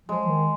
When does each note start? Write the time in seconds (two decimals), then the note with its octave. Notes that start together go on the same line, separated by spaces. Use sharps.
0.09 F3 G#3
0.27 D#3